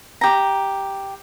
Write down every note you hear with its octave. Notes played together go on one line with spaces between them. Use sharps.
G4 A#5